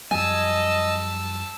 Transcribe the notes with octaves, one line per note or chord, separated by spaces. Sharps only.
F#2 F3 G3 D#5 G#5 A5 E6